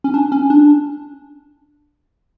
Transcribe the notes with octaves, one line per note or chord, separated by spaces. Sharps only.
C#4
D4
C#4
D4